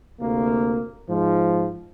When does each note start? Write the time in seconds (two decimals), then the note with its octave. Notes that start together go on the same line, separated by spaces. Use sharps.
0.20 D2 C3 A#3
1.08 G#2 F3